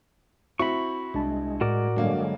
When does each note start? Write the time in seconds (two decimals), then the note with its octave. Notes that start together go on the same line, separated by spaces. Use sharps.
0.59 C4 E4 F#4 B5 C#6
1.14 C2 G#3 D4 A5
1.61 A2 F#4 A#4 D5
1.97 G2 D3 F#3 G#3 A#3